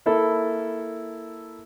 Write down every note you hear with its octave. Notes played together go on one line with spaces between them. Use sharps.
A#3 E4 A4